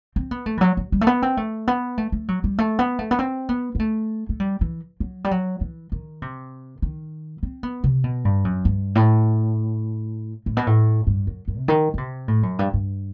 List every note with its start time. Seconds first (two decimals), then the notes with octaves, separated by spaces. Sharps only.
0.16 C4
0.31 B3
0.46 A3
0.57 E3
0.61 F#3
0.77 F#3
0.92 G3
1.01 A3
1.07 B3
1.22 C4
1.37 A3
1.68 B3
1.98 A3
2.12 A3
2.28 F#3
2.44 G3
2.58 A3
2.79 B3
2.99 A3
3.11 B3
3.19 C4
3.49 B3
3.75 B3
3.80 A3
4.29 A3
4.40 G3
4.61 E3
5.00 F#3
5.24 G3
5.31 F#3
5.61 E3
5.92 D#3
6.22 C3
6.82 D#3
7.43 C4
7.63 B3
7.84 C3
8.04 B2
8.25 G2
8.45 F#2
8.65 G2
8.95 A2
10.46 A2
10.57 B2
10.67 A2
11.07 G2
11.27 F#2
11.48 F#2
11.58 C3
11.68 D#3
11.94 D#3
11.98 C3
12.28 A2
12.43 F#2
12.59 G2
12.74 G2